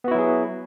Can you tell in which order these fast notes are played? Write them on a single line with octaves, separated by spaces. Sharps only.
B3 F#4 E4 F#3 G#4